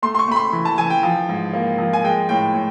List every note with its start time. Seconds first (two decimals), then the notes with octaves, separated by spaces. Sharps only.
0.02 A3 C6
0.15 C6
0.19 C#6
0.28 A3 B5
0.36 C6
0.53 E3 B5
0.65 A5
0.78 E3 G#5
0.90 G5
1.03 F3
1.29 G#2
1.54 A#3
1.78 F3
1.93 G#5
2.04 G#3 G5
2.29 A2 G5
2.54 A2